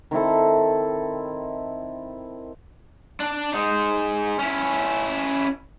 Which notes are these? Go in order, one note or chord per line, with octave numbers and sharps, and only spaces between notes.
D#3 C4 E4 A4
D4 D5
G#3 D#4
C#4 E4